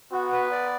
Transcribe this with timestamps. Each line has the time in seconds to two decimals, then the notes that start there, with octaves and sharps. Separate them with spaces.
0.12 B3 F#4
0.32 B4
0.51 D5